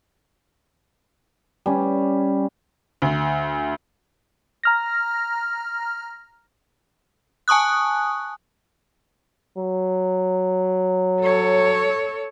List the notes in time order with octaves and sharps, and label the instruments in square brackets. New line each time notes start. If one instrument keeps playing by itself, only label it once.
[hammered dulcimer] G3 C#4
[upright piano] D2
[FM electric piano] A#5 F6 A#6
[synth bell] G#5 A5 C#6 D#6 F#6
[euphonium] F#3
[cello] A4 C#5